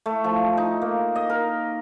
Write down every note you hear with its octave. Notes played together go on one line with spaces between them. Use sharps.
A3
F3
D#4
A#3
D#5
A#4